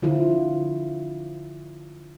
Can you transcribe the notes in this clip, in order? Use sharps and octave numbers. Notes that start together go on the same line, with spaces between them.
D3 F3 E4 F4